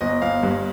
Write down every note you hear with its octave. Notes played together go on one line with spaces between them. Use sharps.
G1 D#5
G1 F5
G2